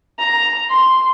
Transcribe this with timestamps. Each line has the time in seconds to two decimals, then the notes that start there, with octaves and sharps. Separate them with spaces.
0.19 A#5
0.70 C6